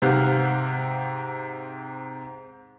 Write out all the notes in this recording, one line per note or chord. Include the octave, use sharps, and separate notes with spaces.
G#2 C3 G4 F5 F#5